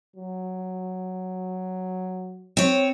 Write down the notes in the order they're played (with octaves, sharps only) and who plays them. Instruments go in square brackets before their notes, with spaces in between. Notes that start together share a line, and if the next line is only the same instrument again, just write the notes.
[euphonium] F#3
[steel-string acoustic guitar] C4 C#5